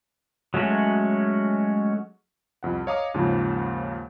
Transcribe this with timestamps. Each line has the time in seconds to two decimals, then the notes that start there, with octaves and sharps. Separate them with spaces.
0.54 F#3 G#3 A3 C#4 F#4
2.63 C2 F2 F#5
2.87 C#5 D#5 F5 A#5 D6 D#6
3.14 D#2 G#2 C#3 F3